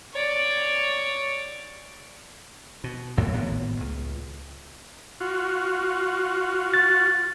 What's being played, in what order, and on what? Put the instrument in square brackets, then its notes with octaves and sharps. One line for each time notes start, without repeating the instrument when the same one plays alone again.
[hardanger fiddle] C#5 D5
[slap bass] B2
B1 F2 A2 A#3
G#1 A2 A#3 B3
C#2
[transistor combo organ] F4 F#4
[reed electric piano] A6